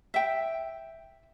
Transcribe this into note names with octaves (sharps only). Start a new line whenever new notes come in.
E5 G5